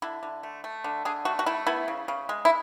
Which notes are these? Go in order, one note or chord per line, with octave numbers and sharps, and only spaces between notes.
D3 E4
D3
A3
A3
D3
D3 G#4
A3 F#4
F#4
A3 E4
B3 E4
C#3
C#3
G#3
E4